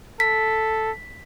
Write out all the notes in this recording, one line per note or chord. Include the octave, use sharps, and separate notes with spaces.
A4 B6